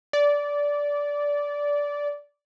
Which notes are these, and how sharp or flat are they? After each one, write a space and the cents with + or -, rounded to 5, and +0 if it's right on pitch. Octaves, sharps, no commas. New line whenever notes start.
D5 -15